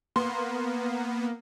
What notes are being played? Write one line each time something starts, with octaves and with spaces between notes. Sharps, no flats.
A#3 B3 C6